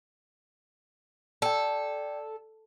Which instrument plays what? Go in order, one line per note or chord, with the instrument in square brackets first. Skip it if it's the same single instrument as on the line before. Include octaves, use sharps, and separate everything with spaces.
[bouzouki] A4 [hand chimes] D5 G5